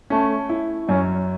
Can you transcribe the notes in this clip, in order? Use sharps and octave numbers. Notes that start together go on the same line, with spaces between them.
A3 C#4
E4
F#2 C#4